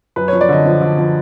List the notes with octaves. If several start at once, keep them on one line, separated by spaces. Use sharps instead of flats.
F#2 B4
F3 C#5
D5
D3 D#5
F3
D3
F3